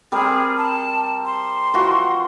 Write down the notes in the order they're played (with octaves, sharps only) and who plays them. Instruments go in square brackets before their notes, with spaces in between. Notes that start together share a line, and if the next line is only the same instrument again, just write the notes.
[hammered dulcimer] G3 C4 A#4 [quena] G#4
[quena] A5
C6
[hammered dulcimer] E3 F3 F#4